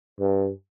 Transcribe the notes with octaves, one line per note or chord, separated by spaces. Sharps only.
G2